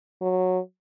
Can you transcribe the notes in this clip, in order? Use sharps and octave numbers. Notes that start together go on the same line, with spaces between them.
F#3